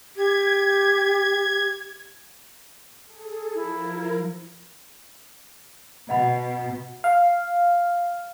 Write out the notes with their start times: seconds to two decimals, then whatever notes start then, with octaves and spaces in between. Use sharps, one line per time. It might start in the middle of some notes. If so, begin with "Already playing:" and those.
0.16 G4 G#6
3.05 G#4 A4
3.55 F3 E4 A#4
6.09 B2 D#5 F#5 B5
7.04 F5